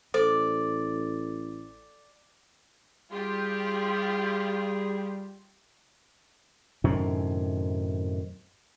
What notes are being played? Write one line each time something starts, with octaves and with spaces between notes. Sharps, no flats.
A1 A4 C5 D5
G3 F4 G4 G#4
F#2 A2 C3 D#3